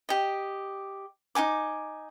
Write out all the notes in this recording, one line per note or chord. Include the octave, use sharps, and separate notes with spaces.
G4 D#5
D#4 F#4 G#5 D6